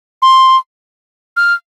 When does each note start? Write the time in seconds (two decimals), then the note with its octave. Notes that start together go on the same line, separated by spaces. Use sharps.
0.22 C6
1.37 F6